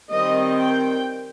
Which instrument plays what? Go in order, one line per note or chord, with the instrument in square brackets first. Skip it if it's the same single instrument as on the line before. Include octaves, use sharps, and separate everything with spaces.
[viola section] D#3 G3 C4 D#5
G5